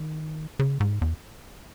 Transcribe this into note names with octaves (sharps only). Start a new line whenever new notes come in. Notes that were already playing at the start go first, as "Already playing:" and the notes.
Already playing: D#3
C#3
G#2
E2